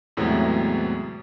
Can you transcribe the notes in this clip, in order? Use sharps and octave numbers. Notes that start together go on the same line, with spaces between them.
E2 A2 C3 F#3 G#3 B3